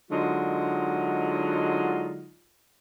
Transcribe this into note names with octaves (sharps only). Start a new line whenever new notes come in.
D3 F#3 G#3 D#4 F4